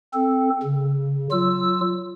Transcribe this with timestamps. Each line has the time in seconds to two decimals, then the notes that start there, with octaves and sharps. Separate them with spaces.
0.13 C4 A4
0.63 C#3
1.31 F#3 F4 E6